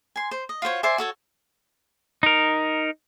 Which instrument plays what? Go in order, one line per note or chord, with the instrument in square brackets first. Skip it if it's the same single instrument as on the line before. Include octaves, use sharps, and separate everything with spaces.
[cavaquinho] G#5 C6
C5
D#5
F4 F#4 C5 C#5
C5 D5 E5 G#5
F#4 A4 C#5
[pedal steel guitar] D#4 A#4